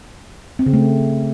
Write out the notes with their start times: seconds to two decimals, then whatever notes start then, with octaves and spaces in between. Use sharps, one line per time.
0.59 C4
0.66 C#3
0.74 A3